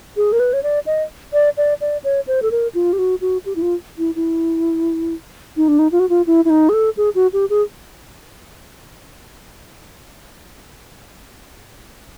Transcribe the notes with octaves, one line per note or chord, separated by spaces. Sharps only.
G#4
A#4
B4
C#5
D5
D#5
D5
D5
D5
C#5
C5
A4
A#4
F4
G4
F#4
F#4
G4
E4
F4
E4
E4
D#4
D4
D#4
F4
F#4
F4
E4
E4
D#4
G#4
A4
G#4
F#4
G4
G#4